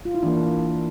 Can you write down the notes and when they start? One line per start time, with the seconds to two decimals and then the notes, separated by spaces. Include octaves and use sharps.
0.05 F4
0.15 E4
0.23 E3 A#3 D4